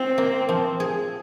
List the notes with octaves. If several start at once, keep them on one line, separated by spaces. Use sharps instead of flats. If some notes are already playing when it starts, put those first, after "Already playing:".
Already playing: C4 F4
A#3
F3
G#4